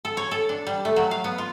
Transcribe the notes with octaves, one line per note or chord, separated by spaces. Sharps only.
A4
C#5
A4
D4
G3
A3
F#3
F5
B3
F4